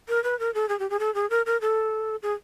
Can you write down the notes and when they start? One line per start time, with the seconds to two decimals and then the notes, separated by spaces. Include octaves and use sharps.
0.08 A#4
0.24 B4
0.39 A#4
0.54 A4
0.69 G#4
0.80 G4
0.90 G#4
1.00 A4
1.15 G#4
1.30 A#4
1.46 A#4
1.61 A4
2.23 G#4